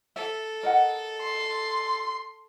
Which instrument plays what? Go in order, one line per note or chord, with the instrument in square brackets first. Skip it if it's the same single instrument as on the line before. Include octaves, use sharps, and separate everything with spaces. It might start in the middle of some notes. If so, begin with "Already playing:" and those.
[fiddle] A4 [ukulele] E5
[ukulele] A#4 D#5 F#5
[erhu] C6